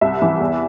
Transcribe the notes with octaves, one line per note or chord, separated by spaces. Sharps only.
C2 E5
E3
E2